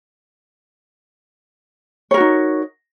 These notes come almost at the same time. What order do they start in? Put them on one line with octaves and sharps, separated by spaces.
C#5 A#4 F#4 D#4